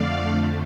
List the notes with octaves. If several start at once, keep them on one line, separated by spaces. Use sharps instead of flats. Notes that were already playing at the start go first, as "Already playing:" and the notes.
Already playing: F2 D3 A3 D5 F5